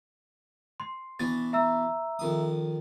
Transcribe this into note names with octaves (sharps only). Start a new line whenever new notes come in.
C6
B2 E3 D4 A6
E5 A#5 E6
F2 D#3 D#6